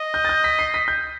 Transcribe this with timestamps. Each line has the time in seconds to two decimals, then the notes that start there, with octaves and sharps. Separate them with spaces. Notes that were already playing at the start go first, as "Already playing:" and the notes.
Already playing: D#5
0.14 G6
0.25 A6
0.29 G6
0.44 B6
0.59 C7
0.74 B6
0.88 G6